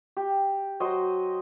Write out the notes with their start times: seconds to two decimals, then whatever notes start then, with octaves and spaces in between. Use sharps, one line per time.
0.17 G4
0.80 F#3 C5 D#5